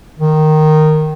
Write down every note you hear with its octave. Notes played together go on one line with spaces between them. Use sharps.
D#3